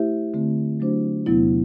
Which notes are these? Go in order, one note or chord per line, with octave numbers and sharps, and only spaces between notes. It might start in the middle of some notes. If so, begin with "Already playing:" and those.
Already playing: A3 E4 G4 C5 E5
D3 A3 C4
F#3 A3 D4 F#4 C5
E2 C3 F#3 B3 E4